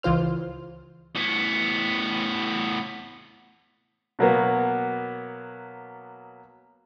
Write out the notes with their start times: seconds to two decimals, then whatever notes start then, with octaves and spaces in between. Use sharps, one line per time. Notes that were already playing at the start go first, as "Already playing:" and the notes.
0.03 C#2 E3 F4 C5 F6
1.16 A2 B3
4.19 B2 F#3 A#3 B3